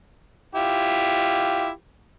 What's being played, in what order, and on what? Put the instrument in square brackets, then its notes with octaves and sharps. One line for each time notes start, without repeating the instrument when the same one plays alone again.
[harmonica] E4 F4 G4